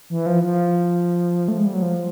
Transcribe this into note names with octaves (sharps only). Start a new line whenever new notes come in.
E3
F3
F3
A3
G#3
G3
F#3
F3